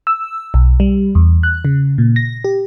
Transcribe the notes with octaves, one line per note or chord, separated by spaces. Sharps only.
E6
B1
G3
E2
F#6
C#3
A#2
A#6
G4